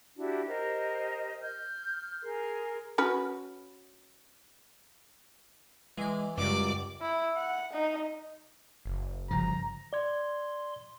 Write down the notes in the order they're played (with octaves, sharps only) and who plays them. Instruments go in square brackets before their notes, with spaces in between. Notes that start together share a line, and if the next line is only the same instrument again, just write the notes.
[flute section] D4 E4 F#4 G4
G4 A#4 C5 D#5
F6 G6
G#4 A#4 C6
[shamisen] C#4 F#4 B4
[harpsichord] E3 D5 [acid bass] G#3
[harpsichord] C#2 G3 [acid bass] F#2 [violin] D5 D6
[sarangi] E4
F#5
D#4
[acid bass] F#1
[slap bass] G1 C#3 F3 [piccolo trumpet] A#5
[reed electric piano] D5 G#6 [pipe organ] C6